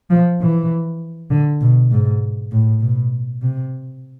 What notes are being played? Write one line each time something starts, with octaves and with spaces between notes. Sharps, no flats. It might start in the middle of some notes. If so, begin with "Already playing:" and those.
F3
E3
D3
B2
G#2
A2
B2
C3